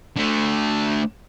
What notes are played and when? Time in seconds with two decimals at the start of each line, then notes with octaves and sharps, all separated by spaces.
0.17 D3 A3